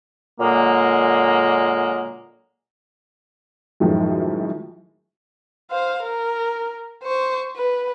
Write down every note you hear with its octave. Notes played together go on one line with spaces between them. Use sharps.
A#2 D3 F#3 G#3 A#3
F#2 A2 D#3 F3 G#3
C5 F5
A#4
C5 C#6
B4